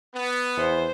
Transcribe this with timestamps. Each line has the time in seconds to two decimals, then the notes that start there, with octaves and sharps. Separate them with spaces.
0.15 B3
0.57 E2 C5